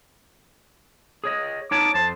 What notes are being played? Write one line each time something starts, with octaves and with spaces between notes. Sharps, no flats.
G#4 C#5 D#5
D#4 C#5 A5 D6
F2 C5 A5